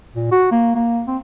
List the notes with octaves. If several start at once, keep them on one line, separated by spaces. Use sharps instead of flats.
A#2
F#4
A#3
A#3
C4